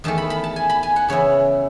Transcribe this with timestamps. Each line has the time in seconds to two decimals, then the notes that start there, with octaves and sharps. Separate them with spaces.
0.04 E2 D#3 A3 A5
0.18 B5
0.30 B5
0.44 A5
0.56 G#5
0.70 B5
0.83 G#5
0.96 F#5
1.09 C#3 E3 B3 E4 C#5